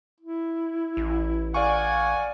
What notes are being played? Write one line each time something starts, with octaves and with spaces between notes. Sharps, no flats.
E4
A1
D5 F5 F#5 G#5 C#6